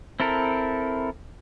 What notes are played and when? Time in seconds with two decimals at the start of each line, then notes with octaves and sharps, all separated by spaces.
0.20 C4 E4 A4 A#4